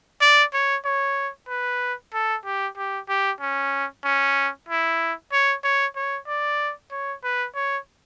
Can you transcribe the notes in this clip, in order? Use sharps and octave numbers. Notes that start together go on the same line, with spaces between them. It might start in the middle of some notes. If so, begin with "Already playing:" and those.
D5
C#5
C#5
B4
A4
G4
G4
G4
C#4
C#4
E4
C#5
C#5
C#5
D5
C#5
B4
C#5